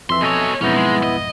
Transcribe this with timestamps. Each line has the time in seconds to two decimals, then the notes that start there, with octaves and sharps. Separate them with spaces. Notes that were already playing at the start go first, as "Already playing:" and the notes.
0.10 F2 E3 E5 C6
0.21 B2 A4 C#5 D#5 G#5
0.61 B1 F2 G#2 B3 C#4 D#4 E4
0.76 G#3
1.03 D#5